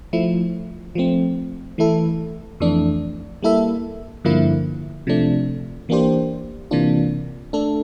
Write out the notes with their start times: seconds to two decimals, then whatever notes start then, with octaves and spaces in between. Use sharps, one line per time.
0.13 F3 A3 E4
0.95 F3 A3 C4
1.78 E3 A3 E4 A4
2.60 F2 E3 A3 D4
3.43 G3 A#3 E4 A4 E5
4.25 G2 D3 F3 A#3 E4
5.07 C3 F3 A3 D4
5.89 E3 A#3 D4 G4 C5
6.71 C3 E3 A#3 D4 F4
7.53 A3 D4 A4